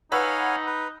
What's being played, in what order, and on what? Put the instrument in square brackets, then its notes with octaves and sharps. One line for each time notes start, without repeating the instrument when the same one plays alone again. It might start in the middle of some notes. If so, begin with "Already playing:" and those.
[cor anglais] D#4 [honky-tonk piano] B4 F#5 E6 [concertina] C#5 F5 G#5
[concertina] B4